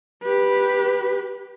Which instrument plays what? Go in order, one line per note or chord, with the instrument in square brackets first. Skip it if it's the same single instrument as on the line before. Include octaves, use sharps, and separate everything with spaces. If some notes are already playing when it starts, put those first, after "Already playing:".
[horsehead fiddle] G4 B4